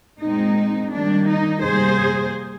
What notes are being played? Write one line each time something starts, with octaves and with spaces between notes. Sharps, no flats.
A#2 G#3 C4 D#4
D#3 G3 A#3 D4
D#4
C3 G3 A#3 G#4 C5